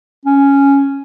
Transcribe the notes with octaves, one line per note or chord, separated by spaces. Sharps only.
C#4